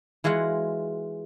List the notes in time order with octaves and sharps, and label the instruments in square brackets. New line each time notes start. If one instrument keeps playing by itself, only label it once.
[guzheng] E3 G#3 F4 F#4 F#5